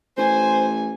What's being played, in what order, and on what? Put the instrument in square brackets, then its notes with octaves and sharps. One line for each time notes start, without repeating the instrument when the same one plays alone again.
[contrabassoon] A1 [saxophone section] C5 [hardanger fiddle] G#5